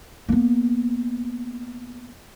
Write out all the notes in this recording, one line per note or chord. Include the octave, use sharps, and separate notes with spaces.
A#3 B3